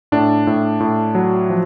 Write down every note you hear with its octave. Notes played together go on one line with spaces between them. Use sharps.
A2 D4
A2
A2
F#3
F3